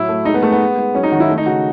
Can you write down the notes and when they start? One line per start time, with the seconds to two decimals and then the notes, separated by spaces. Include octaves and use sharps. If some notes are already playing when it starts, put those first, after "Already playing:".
Already playing: A2 F#3 E4
0.09 A3
0.25 G#3 D#4
0.34 B3
0.43 G#3 A3
0.52 B3
0.60 G#3
0.77 G#3
0.94 F#3 C#4
1.03 D#4
1.12 D#3 F#4
1.20 E4
1.29 A3
1.38 D#4
1.46 C#3 F#4